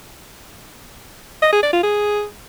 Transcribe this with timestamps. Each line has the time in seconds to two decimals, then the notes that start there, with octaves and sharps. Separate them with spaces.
1.42 D#5
1.52 G#4
1.63 D5
1.73 F4
1.83 G#4